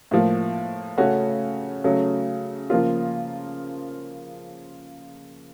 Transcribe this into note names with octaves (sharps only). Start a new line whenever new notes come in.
A2 F3 A#3
C#3 A3 C#4 F#4
C#3 F#3 A3
C#3 F3 A#3 F4